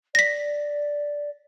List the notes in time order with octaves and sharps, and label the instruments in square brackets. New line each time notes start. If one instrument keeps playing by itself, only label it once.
[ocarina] D5 [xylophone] A#6 B6